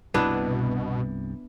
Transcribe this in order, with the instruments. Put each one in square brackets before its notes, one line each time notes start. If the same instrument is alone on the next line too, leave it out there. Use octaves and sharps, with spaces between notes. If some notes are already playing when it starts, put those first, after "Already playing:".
[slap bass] C2 G2 [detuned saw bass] B2 [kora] B3 D4 E4